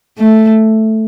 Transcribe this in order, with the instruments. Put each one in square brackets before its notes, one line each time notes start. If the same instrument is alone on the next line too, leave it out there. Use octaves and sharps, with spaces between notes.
[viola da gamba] A3